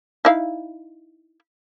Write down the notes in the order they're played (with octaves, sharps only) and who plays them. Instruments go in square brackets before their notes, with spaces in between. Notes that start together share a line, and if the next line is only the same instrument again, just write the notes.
[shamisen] D#4 E4 F5